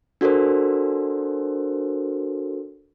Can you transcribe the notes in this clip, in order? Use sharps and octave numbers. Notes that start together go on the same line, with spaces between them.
D4 F#4 A4 A#4 C5